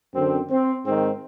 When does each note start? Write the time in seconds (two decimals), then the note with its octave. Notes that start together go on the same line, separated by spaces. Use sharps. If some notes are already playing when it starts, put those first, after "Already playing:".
0.15 F#2 D3 C4
0.51 C4
0.85 G#2 D#3 C4